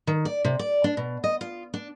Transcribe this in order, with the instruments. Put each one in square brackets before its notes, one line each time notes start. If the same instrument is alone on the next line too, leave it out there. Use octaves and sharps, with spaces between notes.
[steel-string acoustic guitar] D#3
D5
C3
D5
D4
B2
D#5
F4
D4